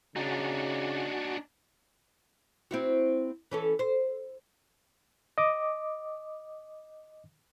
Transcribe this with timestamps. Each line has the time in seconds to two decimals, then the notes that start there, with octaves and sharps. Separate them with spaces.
0.16 C#3 D4 D#4 F#4 F#5 G#5
2.71 C4 E4 F#4
3.51 E3 C#4 A4
3.79 C5
5.38 D#5 D6